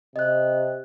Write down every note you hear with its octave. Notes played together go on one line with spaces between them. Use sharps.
C3 D#5 F#6